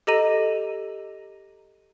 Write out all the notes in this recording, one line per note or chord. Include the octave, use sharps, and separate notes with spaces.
G4 A4 D#5 A#5 D#7